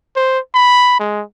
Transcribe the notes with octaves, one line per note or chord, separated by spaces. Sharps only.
C5
B5
G#3